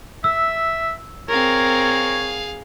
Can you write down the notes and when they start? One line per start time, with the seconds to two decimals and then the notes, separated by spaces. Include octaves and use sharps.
0.24 E5 E6
1.29 C4 G#4 A#4 C#5 F5